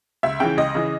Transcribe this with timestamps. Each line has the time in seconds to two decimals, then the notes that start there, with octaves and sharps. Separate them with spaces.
0.23 C#2 E5
0.40 C#3 E3 G5
0.57 C#2 D#5
0.75 C#3 E3